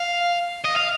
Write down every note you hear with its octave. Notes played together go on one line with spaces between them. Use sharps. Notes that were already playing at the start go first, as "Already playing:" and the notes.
Already playing: F5
D#5
F5